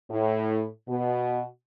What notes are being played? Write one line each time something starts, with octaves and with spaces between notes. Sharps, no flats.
A2
B2